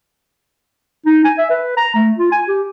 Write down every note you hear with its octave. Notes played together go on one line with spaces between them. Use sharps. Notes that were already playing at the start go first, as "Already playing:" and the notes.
D#4
G#5
E5
B4
A#5
A3
F4
G#5
G4